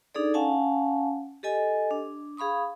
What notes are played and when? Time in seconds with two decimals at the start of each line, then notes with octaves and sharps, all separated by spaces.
0.15 D4 D#4 G#4 A4 D5
0.34 C#4 F5 F#5 G#5 A5
1.43 G4 A4 D#5 G#5
1.91 D4
2.37 G#4 F5 B5 C#6 D#6